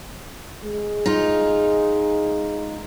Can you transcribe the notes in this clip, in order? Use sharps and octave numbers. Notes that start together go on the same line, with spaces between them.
G#3
D#4 F4